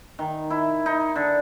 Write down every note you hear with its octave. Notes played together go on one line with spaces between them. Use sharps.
D#3
E4
D#4
D3